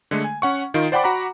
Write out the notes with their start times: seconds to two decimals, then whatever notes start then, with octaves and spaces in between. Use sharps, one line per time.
0.11 D3 G#3 A3
0.24 G#5
0.42 C#4 F#5 C#6
0.74 D#3 D#4 F4
0.92 C5 D5 F#5 G5 B5 D6
1.04 F#4 F#5 A#5 B5 D6